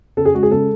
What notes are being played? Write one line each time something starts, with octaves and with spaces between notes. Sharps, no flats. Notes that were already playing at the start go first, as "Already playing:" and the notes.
C#3 A4
G#4
G#3 F#4
G#4
C#3 A4